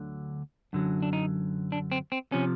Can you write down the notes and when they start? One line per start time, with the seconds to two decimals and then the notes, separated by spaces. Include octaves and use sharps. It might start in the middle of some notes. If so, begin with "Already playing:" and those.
Already playing: D2 D3 F#3
0.73 F#2 D3 F#3
1.03 D4
1.13 D#4
1.72 D4
1.92 C4
2.12 C4
2.32 C3 F3 C#4